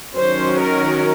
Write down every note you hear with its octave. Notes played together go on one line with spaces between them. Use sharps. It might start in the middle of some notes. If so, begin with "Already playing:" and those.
D#3 F#3 C#4 C5
A#4